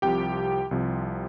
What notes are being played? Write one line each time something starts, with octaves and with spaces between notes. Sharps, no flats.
C2 C3 F3 G4 G5
C2 C3 F3